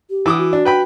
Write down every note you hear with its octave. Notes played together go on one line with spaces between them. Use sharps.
G4
E3 D6 D#6
F#4
D4
B4 G5 B5